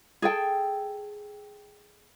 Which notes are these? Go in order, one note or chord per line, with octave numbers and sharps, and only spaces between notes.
G#4 A4 G5